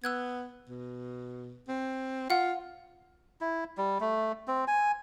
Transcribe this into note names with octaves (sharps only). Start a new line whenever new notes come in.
B3 E6 F#6 G#6
B2
C4
F4 F5 F#5
E4
G3
A3
C4
G#5